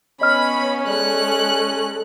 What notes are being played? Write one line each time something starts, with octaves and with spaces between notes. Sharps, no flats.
B3 C#4 C#5 D#5 B5 F6
G#3 A4 D5 F#6